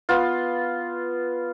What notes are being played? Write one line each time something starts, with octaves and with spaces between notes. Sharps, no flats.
B3 F4